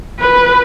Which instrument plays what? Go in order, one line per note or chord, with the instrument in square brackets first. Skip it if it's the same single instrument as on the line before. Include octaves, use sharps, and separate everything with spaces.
[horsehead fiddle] B4